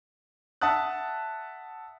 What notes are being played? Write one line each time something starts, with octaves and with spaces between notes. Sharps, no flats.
E5 F#5 A5 D#6 F#6